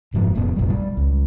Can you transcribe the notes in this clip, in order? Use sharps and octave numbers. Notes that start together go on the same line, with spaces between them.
F#1 G#2 F3
E1 F2 A2 B3
F1 A#1 G3
G3
C#2